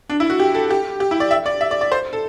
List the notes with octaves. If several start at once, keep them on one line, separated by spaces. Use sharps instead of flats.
D4
E4
F#4
G4
A4
G4
G4
E4
D5
E5
D5
E5
D5
D5
C5
A4